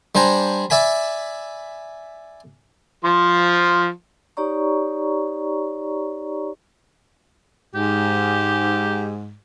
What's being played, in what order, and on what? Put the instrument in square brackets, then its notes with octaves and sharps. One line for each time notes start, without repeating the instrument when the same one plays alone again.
[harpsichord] G3 D4 C5 G#5 A#5
D5 E5 G#5 B5
[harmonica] F3 C6
[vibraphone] D#4 G4 C#5 D5 A#5 C#6
[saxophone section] G#2 [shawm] G4